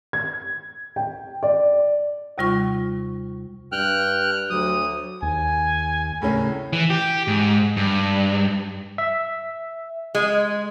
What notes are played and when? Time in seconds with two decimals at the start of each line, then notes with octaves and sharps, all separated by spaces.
0.13 G#6
0.96 G5
1.43 D5
2.38 D#2 C3 G3 F4 C#6
3.72 G2 G5 F6 F#6
4.50 D2 F#3 D#6
5.22 D#2 G#5
6.22 A2 C#3 C#4 A#4
6.73 E3
6.90 G4
7.28 G#2
7.77 G2
8.98 E5
10.15 G#3